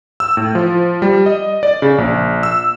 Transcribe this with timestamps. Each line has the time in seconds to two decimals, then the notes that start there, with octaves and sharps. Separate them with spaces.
0.20 E6
0.37 A2
0.55 F3
1.02 G3
1.26 D#5
1.63 D5
1.82 C#3
1.98 A#1
2.43 E6